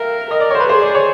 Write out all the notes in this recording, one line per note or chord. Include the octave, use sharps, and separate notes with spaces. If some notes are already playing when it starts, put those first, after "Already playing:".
Already playing: A#4 E5 F5 G5
A#4 D#5
D5
C#5
C5
B4
G#4 C5
D5
C#5